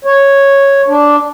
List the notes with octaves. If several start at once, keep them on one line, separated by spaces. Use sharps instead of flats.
C#5
D4